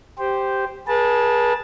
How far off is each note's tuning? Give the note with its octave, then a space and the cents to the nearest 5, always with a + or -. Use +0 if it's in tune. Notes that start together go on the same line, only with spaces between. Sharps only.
G4 +0 C5 -5
G#4 +0 B4 -40 A5 +0